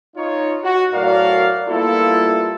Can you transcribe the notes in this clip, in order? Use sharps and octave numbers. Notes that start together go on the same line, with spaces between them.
D#4 F4 C#5
F#4
A2 F#3 F#4 A#4 D5 F5
G3 A#3 B3 E4 F4 A4